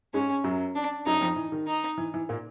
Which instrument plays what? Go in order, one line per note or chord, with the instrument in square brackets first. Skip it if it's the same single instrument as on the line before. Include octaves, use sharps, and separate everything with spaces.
[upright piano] G#2 G#3 [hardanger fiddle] C#4
[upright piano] F#2 F#3
[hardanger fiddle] D4
[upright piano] F#2 F#3 [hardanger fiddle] D#4
[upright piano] F2 F3
E3
D#3
[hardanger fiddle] D#4
[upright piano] E3
E3
A#2 A#3